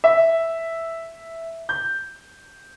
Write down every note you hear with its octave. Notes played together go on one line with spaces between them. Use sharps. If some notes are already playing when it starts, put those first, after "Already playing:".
E5
G6